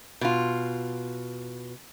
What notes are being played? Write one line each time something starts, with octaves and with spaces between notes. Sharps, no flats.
B2 F4